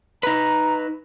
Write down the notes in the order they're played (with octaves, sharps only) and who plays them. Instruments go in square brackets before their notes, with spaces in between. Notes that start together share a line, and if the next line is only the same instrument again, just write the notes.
[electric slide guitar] D#4 B4 [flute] A#5